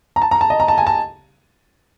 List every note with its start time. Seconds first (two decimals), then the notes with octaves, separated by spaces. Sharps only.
0.16 A#5
0.22 A5
0.31 A#5
0.41 A5
0.50 D#5
0.60 A#5
0.68 A5
0.78 G#5
0.87 A5